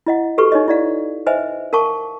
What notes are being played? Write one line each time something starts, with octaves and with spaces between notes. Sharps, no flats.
E4 D#5 F#5
F#4 G4 A4 B4 C#6
D#4 C#5 D#5
E4 D5 F5
B4 C5 D#5 E5 G#5
A#4 F5 A5 C#6 D6